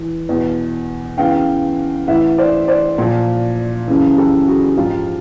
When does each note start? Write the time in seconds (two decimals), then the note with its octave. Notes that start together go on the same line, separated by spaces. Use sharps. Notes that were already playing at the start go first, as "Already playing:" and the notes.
Already playing: E3
0.29 E2 B2
1.18 E2 C#3 E3 F5 G5
2.08 A2 E3 E5 F#5
2.38 C5 D5
2.68 C5 D5
2.98 A#2 F3
3.88 F#2 C#3 E3
4.18 G4 A4
4.47 F#4 G#4
4.77 G#2 F3 F4 G4